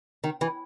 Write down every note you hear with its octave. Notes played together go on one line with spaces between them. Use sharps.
D#3
E3